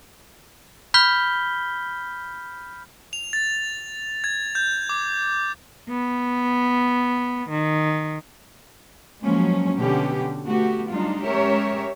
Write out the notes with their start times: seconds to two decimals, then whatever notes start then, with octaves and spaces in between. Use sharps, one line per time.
0.94 B5 F6 G6 B6 G7
3.13 F7
3.33 A6
4.24 G#6
4.55 G6
4.89 D6
5.89 B3
7.50 D#3
9.23 F3 F#3 G#3 A#3 C#4
9.78 B2 D3 B3 C#4 G4
10.45 A3 B3 F#4 G4
10.90 F#3 G3 D4 D#4 F4
11.23 G#3 C#4 G4 A#4 C#5 E5